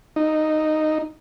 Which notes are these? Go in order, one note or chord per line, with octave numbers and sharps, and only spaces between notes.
D#4